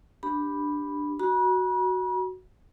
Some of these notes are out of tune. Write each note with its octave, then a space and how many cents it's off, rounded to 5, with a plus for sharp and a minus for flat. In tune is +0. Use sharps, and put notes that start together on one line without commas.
D4 +5 G4 +0 B5 +0
F#4 +0 B5 -45